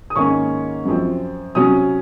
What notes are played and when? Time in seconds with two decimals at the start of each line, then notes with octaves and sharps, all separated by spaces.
0.10 D#6
0.16 G#2 D#3 A#3 C#4 C#6
0.85 F#2 F3 C4
1.55 C3 F#3 C#4 D#6